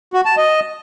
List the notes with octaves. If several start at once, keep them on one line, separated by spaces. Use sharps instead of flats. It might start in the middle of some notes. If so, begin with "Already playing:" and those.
F#4
A5
D#5